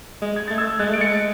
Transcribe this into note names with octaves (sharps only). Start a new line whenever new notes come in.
G#3
G#6
A3 A6
E6 G#6
G#3 F#6 A6
A3
D7
G#3 A6 C#7